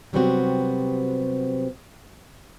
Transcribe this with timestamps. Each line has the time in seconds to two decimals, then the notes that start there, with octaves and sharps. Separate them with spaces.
0.13 C3 F#3 G3 B3 C4 F#4